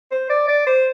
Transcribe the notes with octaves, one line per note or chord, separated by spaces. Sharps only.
C5
D5
D5
C5